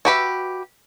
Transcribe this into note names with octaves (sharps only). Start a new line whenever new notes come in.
F#4 G4 B4 E5